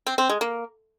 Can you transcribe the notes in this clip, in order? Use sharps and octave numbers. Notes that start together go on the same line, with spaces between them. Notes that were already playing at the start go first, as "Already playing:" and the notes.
C4
C4
G#3
A#3